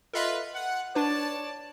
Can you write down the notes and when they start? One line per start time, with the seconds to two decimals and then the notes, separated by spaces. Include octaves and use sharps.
0.13 F4 A4 B4 D#5 E5
0.54 F#5
0.95 D4 B4 C#5 D5 A5